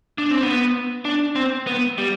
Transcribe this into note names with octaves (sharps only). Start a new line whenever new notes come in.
D4
C4
B3
D4
C4
B3
G3